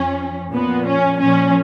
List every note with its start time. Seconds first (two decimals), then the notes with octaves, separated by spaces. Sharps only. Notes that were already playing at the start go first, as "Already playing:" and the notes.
Already playing: F2 F3 C#4
0.53 A#2 F3 B3
0.87 C#4
1.20 A#2 F3 C#4